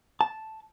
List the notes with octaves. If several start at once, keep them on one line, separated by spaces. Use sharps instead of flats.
A5